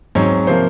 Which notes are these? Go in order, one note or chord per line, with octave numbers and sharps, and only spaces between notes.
G#2 F#3 C4 C#5
C3 F3 A#3 C5